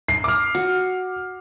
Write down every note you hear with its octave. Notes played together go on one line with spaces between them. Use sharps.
C7
D6 F6
F#4